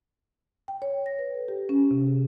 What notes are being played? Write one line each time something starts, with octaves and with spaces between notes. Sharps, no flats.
G5
C#5
A#6
B4
A4
G4
C#4
C3
G#4